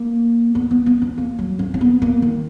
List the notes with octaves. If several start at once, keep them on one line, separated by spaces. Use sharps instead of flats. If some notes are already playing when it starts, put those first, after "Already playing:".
Already playing: A#3
B3
B3
B3
C#4
A#3
F#3
C#4
C#4
B3
A#3
D#3